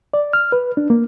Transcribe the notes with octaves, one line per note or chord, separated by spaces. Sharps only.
D5
F6
B4
D4
A#3